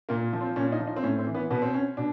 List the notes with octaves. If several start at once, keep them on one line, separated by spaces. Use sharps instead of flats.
A#2 A#3
F3
C4
A#2 C#4
D#4
F3
D#4
C4
A2 C#4
C4
E3
B3
B2 B3
C4
C#4
B2 D4